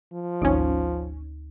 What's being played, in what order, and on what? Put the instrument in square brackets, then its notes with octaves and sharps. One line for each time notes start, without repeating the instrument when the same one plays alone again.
[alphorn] F3
[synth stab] G#1 C#4 [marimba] D2 D#4 D#6